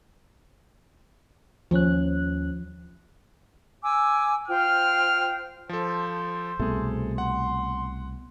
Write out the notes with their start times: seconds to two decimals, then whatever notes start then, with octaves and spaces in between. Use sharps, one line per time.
1.71 D#2 F3 C#4 F#6
3.83 G#5 D6 E6
4.48 F4 C5 G5 F6
5.69 F3 A4 C5
6.59 C2 B2 A3 G#4 A4
7.18 F#5 C6